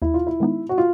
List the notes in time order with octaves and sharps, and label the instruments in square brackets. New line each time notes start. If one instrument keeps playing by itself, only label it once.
[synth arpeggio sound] D#2 [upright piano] E4
[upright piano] F4
E4
[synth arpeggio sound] D#3 G#3 B3 D#4
[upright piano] F#4
F4